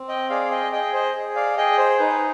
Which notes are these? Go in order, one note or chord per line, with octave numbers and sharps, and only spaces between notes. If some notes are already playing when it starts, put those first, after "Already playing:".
Already playing: C4
D#5 G5
G#4 D5 F5
D#5 G5
G#4 D#5 G5
C5 D#5
G#4
D5 F5
G#4 D#5 G5
C5
D#4 B4